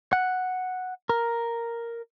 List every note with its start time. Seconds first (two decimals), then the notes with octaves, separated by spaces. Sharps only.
0.13 F#5
1.09 A#4